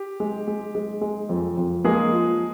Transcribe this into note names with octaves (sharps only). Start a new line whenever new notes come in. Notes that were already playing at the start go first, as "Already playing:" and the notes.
Already playing: G4
G#3
G#3
G#3
G#3
F2
F2
G#3 A#3 G#4
F3